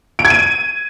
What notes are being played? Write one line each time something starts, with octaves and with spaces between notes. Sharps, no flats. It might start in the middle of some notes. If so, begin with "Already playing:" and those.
D7
G#6
D#7